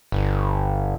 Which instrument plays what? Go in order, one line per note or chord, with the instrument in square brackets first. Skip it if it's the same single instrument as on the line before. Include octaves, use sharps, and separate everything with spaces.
[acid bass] G1